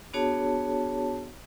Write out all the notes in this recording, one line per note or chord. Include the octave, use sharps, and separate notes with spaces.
B3 D4 F#4 G#4 C#5 A5